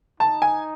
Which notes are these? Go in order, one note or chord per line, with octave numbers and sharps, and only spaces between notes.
D#4 A5
G#5